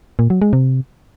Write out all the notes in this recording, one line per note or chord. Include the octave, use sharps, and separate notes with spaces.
A#2
F#3
G#3
C3